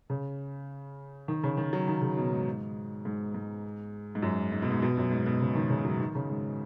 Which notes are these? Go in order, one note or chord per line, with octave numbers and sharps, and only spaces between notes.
C#3
D#3
C#3
D#3
F#3
D#3
C#3
B2
G#2
G#2
G#2
G#2
F#2
G#2
B2
G#2
B2
F#2
G#2
B2
C#3
D#3
C#3
F#3
D#3
C#3
G#2